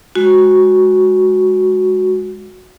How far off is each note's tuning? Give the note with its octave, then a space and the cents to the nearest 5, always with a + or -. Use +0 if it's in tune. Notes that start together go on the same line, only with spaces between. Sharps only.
G#3 +0 F#4 +0